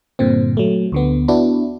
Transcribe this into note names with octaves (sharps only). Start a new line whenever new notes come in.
G2 A#2 D3 C4
F#3 A3
D2 D3 B3
B3 D4 E4 F#4